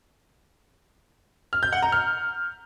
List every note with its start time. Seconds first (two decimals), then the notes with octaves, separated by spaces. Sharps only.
1.53 F6
1.63 G6
1.73 F#5
1.82 A#5
1.92 F6